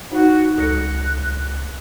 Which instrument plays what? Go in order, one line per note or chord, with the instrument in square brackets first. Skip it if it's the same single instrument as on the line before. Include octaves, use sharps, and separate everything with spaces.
[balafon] D#4 [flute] F#4
[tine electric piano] C#2 A#6 C#7 [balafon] A4 [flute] F#6